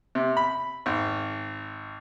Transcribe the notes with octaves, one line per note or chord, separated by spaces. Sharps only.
C3
B5
G#1